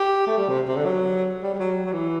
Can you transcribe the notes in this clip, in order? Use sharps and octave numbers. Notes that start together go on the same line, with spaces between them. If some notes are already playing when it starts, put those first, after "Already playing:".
Already playing: G4
A3
G3
C3
C3
D3
F#3
G3
G3
F#3
F#3
E3